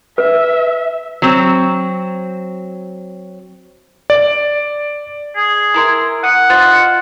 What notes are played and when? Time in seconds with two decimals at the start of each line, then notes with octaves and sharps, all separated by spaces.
0.18 B4 E5
1.22 F#3 C4
4.10 D5
5.36 G#4
5.74 E4 A#4 C6
6.24 F#5 D#6
6.49 F4 C5 D#5